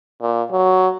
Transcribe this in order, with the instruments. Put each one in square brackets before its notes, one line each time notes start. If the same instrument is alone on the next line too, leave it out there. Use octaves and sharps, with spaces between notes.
[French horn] A#2
F#3